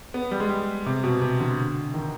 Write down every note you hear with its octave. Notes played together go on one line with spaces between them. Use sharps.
B3
G3
G#3
G3
C3
B2
C3
D3
D#3